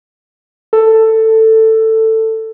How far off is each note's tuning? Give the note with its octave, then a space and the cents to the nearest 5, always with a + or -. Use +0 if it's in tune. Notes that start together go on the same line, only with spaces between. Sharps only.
A4 +10